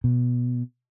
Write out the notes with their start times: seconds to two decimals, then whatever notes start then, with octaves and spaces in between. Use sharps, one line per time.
0.04 B2